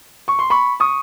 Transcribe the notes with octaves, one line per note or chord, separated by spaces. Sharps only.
C#6
C6
B5 C#6
C#6 D#6